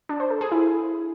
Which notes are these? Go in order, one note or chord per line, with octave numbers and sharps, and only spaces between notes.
D4
C5
A4
G#4
E4